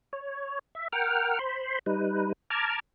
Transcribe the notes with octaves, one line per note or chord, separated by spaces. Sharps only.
C#5
E5
A#4 F#5 G5 F6
C5 B5 C6
G3 D#4 B4
A5 A#5 D6 F6 G#6